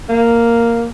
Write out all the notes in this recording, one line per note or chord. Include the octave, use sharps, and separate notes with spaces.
A#3